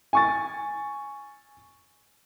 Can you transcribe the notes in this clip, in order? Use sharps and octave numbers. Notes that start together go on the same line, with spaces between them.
G#5 C#6 A6